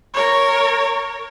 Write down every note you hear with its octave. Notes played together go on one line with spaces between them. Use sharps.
A#4 C#5